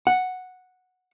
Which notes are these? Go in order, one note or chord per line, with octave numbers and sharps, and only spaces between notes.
F#5